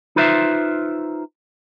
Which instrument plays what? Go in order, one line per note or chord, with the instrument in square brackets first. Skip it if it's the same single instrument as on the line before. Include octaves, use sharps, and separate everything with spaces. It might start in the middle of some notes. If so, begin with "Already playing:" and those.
[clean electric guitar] D#4 F4 B4 C5 E5